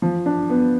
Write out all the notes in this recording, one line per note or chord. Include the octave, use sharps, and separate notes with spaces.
F3
D4
B3